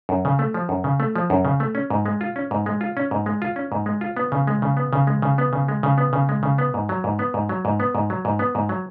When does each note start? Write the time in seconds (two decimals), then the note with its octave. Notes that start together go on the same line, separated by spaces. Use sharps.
0.09 F#2
0.25 C#3
0.39 A3
0.54 F3
0.69 F#2
0.84 C#3
1.00 A3
1.16 F3
1.30 F#2
1.45 C#3
1.60 A3
1.75 C#4
1.90 G#2
2.06 G#3
2.21 F4
2.36 C#4
2.51 G#2
2.66 G#3
2.81 F4
2.97 C#4
3.11 G#2
3.26 G#3
3.42 F4
3.56 C#4
3.72 G#2
3.86 G#3
4.01 F4
4.17 B3
4.32 C#3
4.47 G#3
4.62 C#3
4.77 B3
4.93 C#3
5.07 G#3
5.22 C#3
5.38 B3
5.53 C#3
5.68 G#3
5.83 C#3
5.98 B3
6.13 C#3
6.29 G#3
6.43 C#3
6.58 B3
6.74 G#2
6.89 F#3
7.04 G#2
7.19 B3
7.34 G#2
7.49 F#3
7.65 G#2
7.80 B3
7.95 G#2
8.10 F#3
8.25 G#2
8.39 B3
8.55 G#2
8.69 F#3